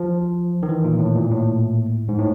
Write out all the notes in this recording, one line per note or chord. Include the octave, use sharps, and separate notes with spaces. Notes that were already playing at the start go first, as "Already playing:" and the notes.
Already playing: F3
D#3
E3
A#2
A2
A#2
A2
G#2
A2